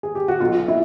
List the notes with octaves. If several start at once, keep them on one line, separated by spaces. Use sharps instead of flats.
G#4
G4
F#4
B1 B2 F4
E4